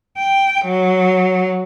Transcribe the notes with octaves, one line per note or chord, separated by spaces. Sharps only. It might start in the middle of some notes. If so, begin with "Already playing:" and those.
G5
F#3